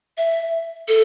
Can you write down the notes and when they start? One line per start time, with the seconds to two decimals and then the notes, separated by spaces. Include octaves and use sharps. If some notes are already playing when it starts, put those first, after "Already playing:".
0.18 E5
0.88 A4